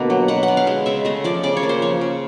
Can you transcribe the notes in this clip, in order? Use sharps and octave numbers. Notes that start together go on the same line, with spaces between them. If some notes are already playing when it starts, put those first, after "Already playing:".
Already playing: B2 D3 A#3
F#3
B2 F#5
F#5
B3
F5
G#3
C#3 E5
A3 D#5
F3 D5
C#3 D5
C#5
A#3
C5
F3 C#5
C#3